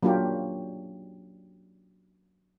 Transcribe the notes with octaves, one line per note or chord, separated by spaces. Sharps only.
F#3 A#3 D4 F4 G4